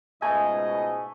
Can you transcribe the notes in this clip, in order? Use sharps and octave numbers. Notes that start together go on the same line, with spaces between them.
C#2 G#2 B2 A3 B4 D#5 G#5